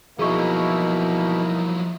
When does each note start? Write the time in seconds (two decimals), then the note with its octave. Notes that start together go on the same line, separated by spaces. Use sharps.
0.19 B2 F3 F#3 A#3 D#4 E4 G#4 C#6